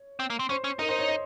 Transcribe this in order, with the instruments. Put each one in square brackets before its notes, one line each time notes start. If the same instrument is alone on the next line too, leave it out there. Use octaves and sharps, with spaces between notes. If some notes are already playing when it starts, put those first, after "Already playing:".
Already playing: [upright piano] C#5
[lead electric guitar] C4
A#3
C4
[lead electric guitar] C#4 [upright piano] C5
[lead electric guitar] C#4
[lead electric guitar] D#4 [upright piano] A#4
[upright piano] C5
C#5
D#5